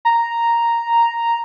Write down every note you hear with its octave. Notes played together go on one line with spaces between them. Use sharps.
A#5